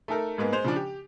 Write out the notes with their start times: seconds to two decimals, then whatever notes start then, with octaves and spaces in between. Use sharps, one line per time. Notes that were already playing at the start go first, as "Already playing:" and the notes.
0.08 A3 D#4 A4 A#4
0.38 G#2 G#3 A#3 B3
0.52 G#3 C5 F7
0.64 C#3 F3 D4
0.76 G4